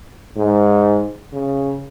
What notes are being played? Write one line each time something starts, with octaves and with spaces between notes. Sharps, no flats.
G#2
C#3